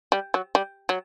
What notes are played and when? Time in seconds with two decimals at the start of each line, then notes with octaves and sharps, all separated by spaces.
0.12 G3
0.34 F#3
0.55 G3
0.89 F#3